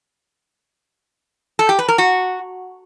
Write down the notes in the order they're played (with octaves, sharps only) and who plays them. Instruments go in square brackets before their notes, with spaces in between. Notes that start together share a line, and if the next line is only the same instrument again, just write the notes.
[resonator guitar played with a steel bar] A4
G4
B4
A#4
F#4